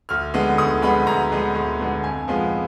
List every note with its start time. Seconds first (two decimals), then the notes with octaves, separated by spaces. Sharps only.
0.09 D2 F6
0.34 D3 G#3 B3
0.58 D2 D#6
0.82 D3 G#3 B3 B5
1.07 D2 A#5
1.32 D3 G#3 B3
1.55 D2
1.79 D3 G#3 B3
2.04 F2 G#5
2.28 F3 G#3 B3